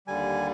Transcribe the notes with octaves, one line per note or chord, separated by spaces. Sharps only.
D#2 D3 G3 G#5